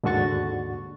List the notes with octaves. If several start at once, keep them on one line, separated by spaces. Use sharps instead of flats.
D#2 G#2 D3 F#4 C#6 A6